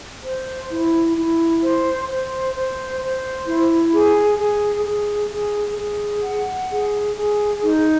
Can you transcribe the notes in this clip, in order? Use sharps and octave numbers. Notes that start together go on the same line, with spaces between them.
C5
E4
E4
C5
C5
C5
C5
E4
G#4
G#4
G#4
G#4
G#4
F#5
G#4
G#4
D#4